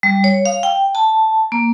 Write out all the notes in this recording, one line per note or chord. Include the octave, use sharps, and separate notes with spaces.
G3
C#5
F5
G5
A5
A#3